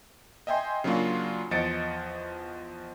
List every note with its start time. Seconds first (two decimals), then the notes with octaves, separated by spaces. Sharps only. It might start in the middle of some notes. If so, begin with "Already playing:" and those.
0.47 D#5 E5 G5 G#5 C6
0.84 C#3 F#3 A#3 D4 F4 F#4
1.51 E2 F3 D#5 A6 C#7 D7